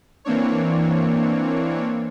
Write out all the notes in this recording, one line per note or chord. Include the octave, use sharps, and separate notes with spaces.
E3 A#3 C4 D4 C#5